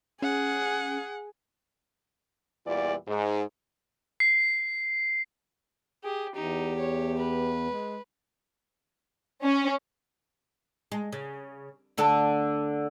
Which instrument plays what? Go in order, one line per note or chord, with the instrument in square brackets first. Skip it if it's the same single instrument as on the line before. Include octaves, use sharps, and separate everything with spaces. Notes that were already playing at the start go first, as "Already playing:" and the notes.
[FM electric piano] C#4 [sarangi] G#4 [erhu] F#5
[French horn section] E2 A#2 E3 G3 F4 D5
G#2
[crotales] C7
[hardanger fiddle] G4 [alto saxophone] G#4
[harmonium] E2 [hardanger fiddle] D#4 [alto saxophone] G4
[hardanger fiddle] C#5
B4
[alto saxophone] G#3
[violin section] C#4
[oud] G#3
C#3
D2 D3 A4